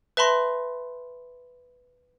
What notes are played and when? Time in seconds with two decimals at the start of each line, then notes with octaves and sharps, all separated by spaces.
0.17 B4 E5 A5 B5 C6 A#6